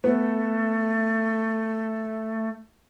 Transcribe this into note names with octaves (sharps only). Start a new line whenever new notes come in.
A3 B3